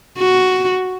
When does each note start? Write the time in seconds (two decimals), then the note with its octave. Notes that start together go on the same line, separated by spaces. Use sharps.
0.18 F#4